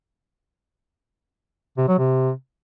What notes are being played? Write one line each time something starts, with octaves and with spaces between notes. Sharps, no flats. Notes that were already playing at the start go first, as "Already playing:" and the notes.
C3
F#3
C3